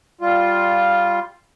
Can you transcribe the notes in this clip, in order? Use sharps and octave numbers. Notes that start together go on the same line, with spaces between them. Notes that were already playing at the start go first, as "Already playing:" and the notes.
G3 F4